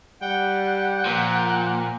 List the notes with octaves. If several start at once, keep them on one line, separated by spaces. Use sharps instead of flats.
G3 F#5 G5
A#2 F3